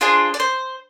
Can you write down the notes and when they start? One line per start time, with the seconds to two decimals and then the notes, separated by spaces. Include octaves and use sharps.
0.01 D4 F4 G#4 C5
0.34 D5
0.40 C5